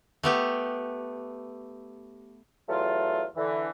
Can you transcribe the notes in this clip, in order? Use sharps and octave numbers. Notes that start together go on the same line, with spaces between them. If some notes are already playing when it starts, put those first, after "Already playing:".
A3 B3 G4
E2 F#3 A3 F4
D3 E3